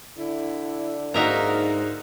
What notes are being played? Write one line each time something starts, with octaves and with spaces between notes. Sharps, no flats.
D3 E4
G#2 A#3 D#4 F#4 A#4 E5 A#5